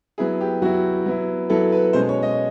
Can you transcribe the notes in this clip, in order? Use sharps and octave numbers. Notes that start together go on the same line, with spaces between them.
F#3 B3 E4 G#4
G4
F#3 B3 E4 F#4
F#3 B3 E4
F#3 B3 E4 A4
B4
B2 G#3 C#4 C5
C#5
D#5